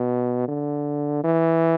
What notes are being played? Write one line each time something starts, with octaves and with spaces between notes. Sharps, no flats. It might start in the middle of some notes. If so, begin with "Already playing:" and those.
Already playing: B2
D3
E3